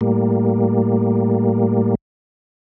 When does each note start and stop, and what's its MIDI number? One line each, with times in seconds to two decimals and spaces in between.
0.01 1.95 45
0.01 1.95 55
0.01 1.95 58